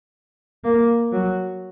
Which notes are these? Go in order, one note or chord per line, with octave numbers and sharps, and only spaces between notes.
A#3
F#3